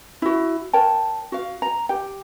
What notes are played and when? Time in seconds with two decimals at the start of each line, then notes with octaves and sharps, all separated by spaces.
0.22 E4 F#4
0.73 A#4 C#5 G5 A5
1.32 F#4 F5
1.62 A#5
1.89 G4 G5